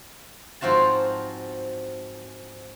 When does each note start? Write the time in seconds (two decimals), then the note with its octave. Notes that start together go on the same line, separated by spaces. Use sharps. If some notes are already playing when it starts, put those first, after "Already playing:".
0.61 G#2 F3 C4 F4 F#4 A5